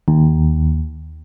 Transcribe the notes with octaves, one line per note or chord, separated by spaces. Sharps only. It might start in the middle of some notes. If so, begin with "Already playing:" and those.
D#2